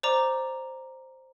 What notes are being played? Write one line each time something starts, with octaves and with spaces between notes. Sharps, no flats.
C5 D5 A#5 D6